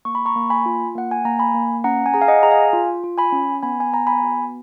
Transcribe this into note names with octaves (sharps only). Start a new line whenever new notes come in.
A#3 C#6
B5
A#5 C#6
A#3
G#5 B5
F4
A#3 F#5
G#5
A#3 A#5
G#5 B5
A#3
C#4 F#5 A#5
G#5
G#4 A#5
F5 G#5
D#5 F#5
G#4 A#5
F5 G#5
F4
F4
G#5 B5
C#4
B3 G#5 B5
G#5
B3 A#5
G#5 B5
F#4